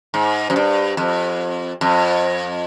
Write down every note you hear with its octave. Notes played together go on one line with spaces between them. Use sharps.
G#2
F#2
G2
F2
F2